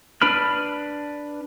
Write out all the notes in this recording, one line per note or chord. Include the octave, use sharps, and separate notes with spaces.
D4 B4 B5 F6